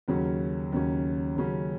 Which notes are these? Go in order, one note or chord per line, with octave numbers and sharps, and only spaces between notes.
D#2 C#3 F#3 C#4
D#2 C#3 F#3 C#4
D#2 C#3 F#3 C#4